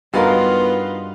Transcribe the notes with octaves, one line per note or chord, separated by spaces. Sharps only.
G2 B3 D#4 F4 F#4 A#4 B4 F5